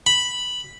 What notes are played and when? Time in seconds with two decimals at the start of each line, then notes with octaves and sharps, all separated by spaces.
0.07 B5